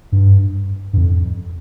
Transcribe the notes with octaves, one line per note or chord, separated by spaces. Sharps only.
G2
G2
F2